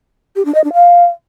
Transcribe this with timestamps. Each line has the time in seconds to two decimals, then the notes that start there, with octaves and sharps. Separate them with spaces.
0.36 G4
0.45 D4
0.55 D#5
0.64 D4
0.74 F5